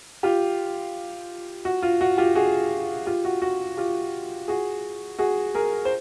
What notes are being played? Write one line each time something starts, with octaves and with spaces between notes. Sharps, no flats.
F4 G4
F#4
F4
F#4
F4 G4
F#4 G#4
F4 G4
F#4
F#4
F4 G4
F#4 G#4
F#4 G#4
G#4 A#4
C5